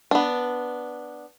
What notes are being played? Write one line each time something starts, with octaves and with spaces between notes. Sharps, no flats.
B3 D4